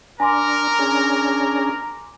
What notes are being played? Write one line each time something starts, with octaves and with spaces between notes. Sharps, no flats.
D4 A#4 G#5 A#5 C6 D6
C#4 D4 G#4